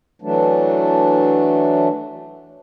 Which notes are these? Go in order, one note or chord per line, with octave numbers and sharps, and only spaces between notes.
E3 F#3 A3 D4